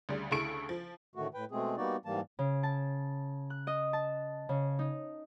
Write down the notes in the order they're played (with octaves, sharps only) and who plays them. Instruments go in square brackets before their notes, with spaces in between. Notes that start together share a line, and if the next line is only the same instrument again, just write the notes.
[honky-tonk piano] D2 C#3 G3
D2 C#3 E4 A4 C#6 D7
F3
[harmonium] A2 D3 D#3 A3 F#4
A2 B4 G5
B2 G#3 A3 C4 G#4
G3 A#3 B3 D#4 F#4 D5
G#2 E3 G3 A#3 A5
[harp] C#3
A5
F#6
D#5
A5
C#3
D#4